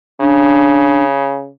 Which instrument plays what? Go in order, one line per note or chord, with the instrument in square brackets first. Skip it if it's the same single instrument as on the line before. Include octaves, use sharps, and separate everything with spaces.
[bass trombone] C#3 [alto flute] D4